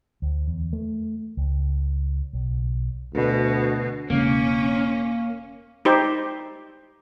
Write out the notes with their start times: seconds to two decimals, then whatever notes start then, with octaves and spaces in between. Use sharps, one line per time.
0.22 D2
0.48 E2
0.73 A3
1.37 C#2
2.33 B1
3.14 D2 B2
4.10 E1 C#3 G#3 A#3 C#4
5.85 D#4 G4 C5